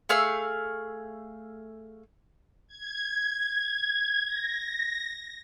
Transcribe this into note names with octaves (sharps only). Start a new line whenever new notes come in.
A3 G#4 F5 E6
G#6
A#6